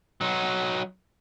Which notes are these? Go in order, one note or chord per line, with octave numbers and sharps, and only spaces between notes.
F#3 D#4